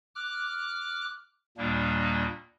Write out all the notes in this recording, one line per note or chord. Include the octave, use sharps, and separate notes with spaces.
D6 F6 F#6
D#2 A#2 G3 A#3 D4